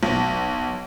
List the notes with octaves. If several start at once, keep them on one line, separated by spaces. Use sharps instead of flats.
B1